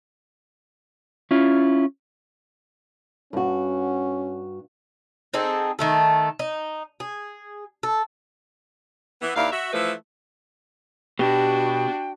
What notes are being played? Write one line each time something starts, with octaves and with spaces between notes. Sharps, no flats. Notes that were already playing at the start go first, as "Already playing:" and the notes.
C#4 E4 F4
G2 C#4 F#4
C4 D#4 G#4 A4
D#3 A3 A4
D#4
G#4
A4
E3 B3
D#2 E4 D5 F5
F#4 E5
E3 F3 A3 A4 B4
B2 D4 F#4 G4 G5